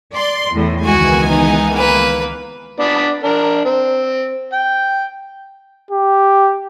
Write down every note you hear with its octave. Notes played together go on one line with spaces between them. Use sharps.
D5 C6
E2 A2
C#2 D#3 E3 G#3 B3 F#4 G#5
D#4
A#3 B4
B3 D4 D5
D4 A#4
C4
G5
G4